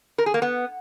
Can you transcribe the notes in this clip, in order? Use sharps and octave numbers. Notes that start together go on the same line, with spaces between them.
A#4
G#4
A#3
B3